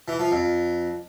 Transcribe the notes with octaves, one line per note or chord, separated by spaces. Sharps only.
E3
F3
F2